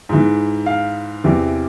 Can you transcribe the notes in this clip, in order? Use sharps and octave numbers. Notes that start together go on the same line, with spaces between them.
G#2 E3
F5
E2 C3 E3